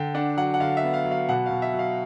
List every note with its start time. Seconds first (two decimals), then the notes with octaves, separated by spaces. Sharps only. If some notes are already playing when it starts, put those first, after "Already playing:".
Already playing: D3 G5
0.15 D4 F#5
0.37 F#3 F#5
0.54 F#5
0.60 D3 F5
0.77 E5
0.83 B3
0.93 F5
1.05 F#3
1.11 F5
1.29 B2 F#5
1.46 B2 F5
1.62 E5
1.74 F#3
1.79 F5